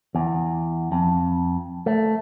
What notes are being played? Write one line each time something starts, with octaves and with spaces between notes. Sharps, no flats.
E2
F2
A3